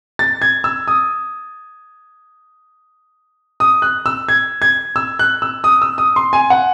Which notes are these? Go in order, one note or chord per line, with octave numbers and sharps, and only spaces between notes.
A6
G#6
E6
D#6
D#6
F#6
E6
G#6
G#6
E6
F#6
E6
D#6
E6
D#6
C6
G#5
F#5